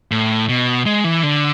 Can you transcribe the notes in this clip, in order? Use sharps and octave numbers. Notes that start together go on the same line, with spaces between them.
A2
B2
G#3
E3
D3